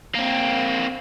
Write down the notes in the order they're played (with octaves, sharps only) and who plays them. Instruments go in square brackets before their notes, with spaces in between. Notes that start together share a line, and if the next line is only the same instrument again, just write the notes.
[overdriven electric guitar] A#3 C4